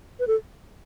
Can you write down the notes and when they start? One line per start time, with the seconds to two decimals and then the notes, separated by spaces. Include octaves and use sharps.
0.20 B4
0.27 A4